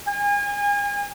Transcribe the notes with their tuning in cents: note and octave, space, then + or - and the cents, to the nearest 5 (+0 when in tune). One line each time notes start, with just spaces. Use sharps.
G#5 -35